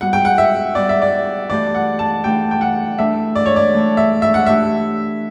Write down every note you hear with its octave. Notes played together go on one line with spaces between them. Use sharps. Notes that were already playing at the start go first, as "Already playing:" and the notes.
G3 B3 F#4 F#5
G5
F#5
E5
G3 B3 F#4 D5
E5
D5
E3 A3 D4 G4 D5
F#5
A5
E3 A3 D4 G4 G5
G5
F#5
E3 A3 D4 E5
D5
C#5
D5
E3 A3 D4
E5
E5
F#5
E3 A3 D4 G4 E5